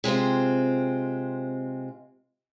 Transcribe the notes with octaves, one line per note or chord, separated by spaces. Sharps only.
C3 G#3 C4 F4